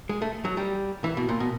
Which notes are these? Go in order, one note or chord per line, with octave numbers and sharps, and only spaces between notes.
G#3
A3
F#3
G3
E3
B2
A#2
B2